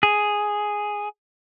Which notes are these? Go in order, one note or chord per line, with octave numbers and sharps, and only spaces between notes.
G#4